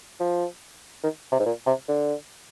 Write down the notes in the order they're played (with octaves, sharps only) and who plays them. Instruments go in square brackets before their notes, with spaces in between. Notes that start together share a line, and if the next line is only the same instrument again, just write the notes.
[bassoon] F3
D#3
C3
G#2
A#2
C3
D3